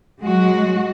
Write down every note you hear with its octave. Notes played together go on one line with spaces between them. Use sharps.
F#3 G#3 F#4